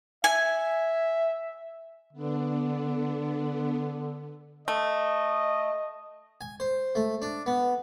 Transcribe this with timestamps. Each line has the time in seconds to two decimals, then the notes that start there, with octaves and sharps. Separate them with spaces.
0.24 E5 G#5
2.13 D3 B3 D4
4.68 A3 D#5
6.41 G#5
6.60 C5
6.95 A3
7.22 D4
7.46 B3